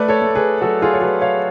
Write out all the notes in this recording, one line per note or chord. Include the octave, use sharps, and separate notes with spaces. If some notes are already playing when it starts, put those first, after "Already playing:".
Already playing: A3 B4 D5
A4 C#5
A3
G#4 B4
F#3 F#4 A4
F4 G#4
C#5
F#3 G#4 B4
C#5 F5